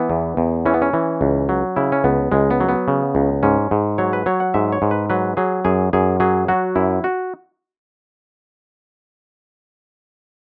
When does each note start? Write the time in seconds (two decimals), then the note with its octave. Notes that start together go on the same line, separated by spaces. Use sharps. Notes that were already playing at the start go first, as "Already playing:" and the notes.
Already playing: E3 B3
0.10 E2
0.37 E2
0.66 E3 C#4
0.74 B3
0.82 C#4
0.93 E3
1.21 C#2
1.49 F#3
1.76 C#3 E4
1.92 C#4
2.04 C#2 B3
2.32 C#2 G#3
2.51 B3
2.60 F#3
2.69 B3
2.88 C#3
3.15 C#2
3.43 G#2 C#4
3.71 G#2
3.98 F#3 C#5
4.13 B4
4.26 F#3 C#5
4.40 F#5
4.54 G#2 E5
4.72 C#5
4.82 G#2
4.91 B4
5.10 F#3 B4
5.37 F#3 G#4
5.65 F#2 G#4
5.93 F#2 G#4
6.20 F#3 G#4
6.48 F#3 F#4
6.76 F#2 E4
7.04 F#4